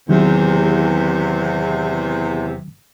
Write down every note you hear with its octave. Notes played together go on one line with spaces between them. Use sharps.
E2 C3 D#3 F#3